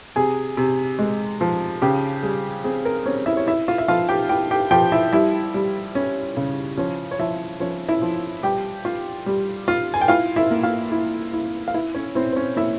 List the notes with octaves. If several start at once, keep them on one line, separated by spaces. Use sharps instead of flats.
C3 G#4 G#5
C3
G#3
F3
C#3 G4 G5
G3 G#4
C4 G#4
A#4
C4 C#4 C#5
E4 E5
C#5
E4 E5
F4 F5
E5
F3 F4 F5
G4 G5
E4 G4 G5
G4 G5
F3 G4 G5
E4 E5
G3 E4 E5
G3
C#4
C#3
F3 C#4 C#5
C#5
F3 E4 E5
F3 C#4 C#5
E4 E5
F3
G3 G4 G5
F4
G3
F4
G#5
G5
E4 F4 F5
E4 E5
A#3
F4 F5
E4
E4
F5
E4 E5
C#4 C#5
C4 E4 C5
C5
C#4 C#5
A#3 E4 E5